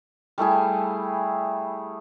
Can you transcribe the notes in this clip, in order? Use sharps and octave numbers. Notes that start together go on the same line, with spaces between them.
G3 A3 E4 G#4